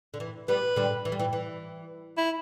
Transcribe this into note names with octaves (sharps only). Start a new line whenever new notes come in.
D3
E3
G3 B3 B4
D3 G3
E3
G3
E3
E3
E4